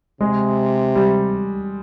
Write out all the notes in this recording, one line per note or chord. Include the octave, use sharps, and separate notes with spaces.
C3 G#3
G3